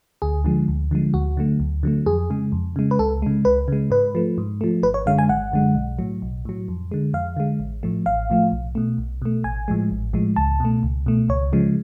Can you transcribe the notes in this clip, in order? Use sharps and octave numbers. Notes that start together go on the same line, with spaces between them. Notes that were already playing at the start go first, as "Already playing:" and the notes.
D2 G#4
D3 F3 G#3
D2
D3 F3 G#3
D2 F#4
D3 F#3 A3
D2
D3 F#3 A3
F2 G#4
C#3 G#3
F2
C#3 G#3
B4
C#2 A4
C#3 G#3
C#2 B4
C#3 G#3
G#2 B4
F3 A3
G#2
F3 A3
G#1 B4
C#5
F#2 D3 G#3 F5
G#5
G#1 F#5
F#2 D3 G#3
B1
A2 F#3
B1
A2 F#3
F2
D3 G#3
F2 F5
D3 G#3
A1
A2 F3 A3
A1 F5
A2 F3 A3
B1
B2 A3
B1
B2 A3
A1 G#5
A2 F3 G#3
A1
A2 F3 G#3
C#2 A5
B2 A3
C#2
B2 A3
C#2 C#5
C#3 F3 G#3